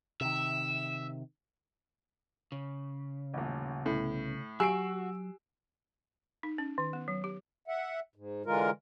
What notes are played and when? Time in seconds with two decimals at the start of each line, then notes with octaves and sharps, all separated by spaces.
0.21 C3 D#3 E5 E7
2.52 C#3
3.34 D#1 A1
3.86 C2 A2 B3 C#4
4.60 F#3 F#4 G4 G#5 E6 C7 D7
6.43 D#4
6.58 C#4
6.78 D#3
6.93 B3
7.08 F#3
7.24 G4
7.68 E5 F#5
8.16 G#2
8.46 D3 E3 G#3 F4 A#4